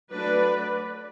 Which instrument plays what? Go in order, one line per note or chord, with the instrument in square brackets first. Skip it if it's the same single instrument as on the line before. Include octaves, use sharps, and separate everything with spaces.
[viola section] F#3 A3 D4 B4 D5